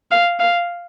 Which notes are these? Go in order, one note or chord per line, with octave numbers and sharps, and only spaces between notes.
F5
F5